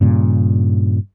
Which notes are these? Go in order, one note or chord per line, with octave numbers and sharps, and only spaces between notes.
G2 A#2 C#3